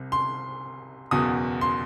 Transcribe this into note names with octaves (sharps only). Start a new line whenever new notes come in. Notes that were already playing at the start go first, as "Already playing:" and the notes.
Already playing: C2 C3
C6
F#1 E2 B2 D#6
C6